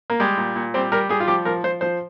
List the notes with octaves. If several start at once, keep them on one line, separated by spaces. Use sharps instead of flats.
A#3
G3 G#3
A#2
A#2
G3 C4
G3 A#4
G3 G#4
F4
F3 G4
F3 A#4
F3 C5
F3 C5